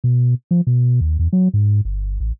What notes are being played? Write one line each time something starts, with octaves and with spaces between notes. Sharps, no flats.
B2
F3
B2
D#2
E2
F#3
G#2
G1
A1